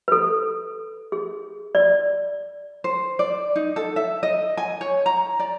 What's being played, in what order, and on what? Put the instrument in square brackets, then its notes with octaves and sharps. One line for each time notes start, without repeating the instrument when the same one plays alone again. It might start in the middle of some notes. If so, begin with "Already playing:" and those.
[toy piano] A4 B4
G#4
D5
[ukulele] C5
D5
D#4
A4
E5
D#5
G#5
C#5
A#5
D5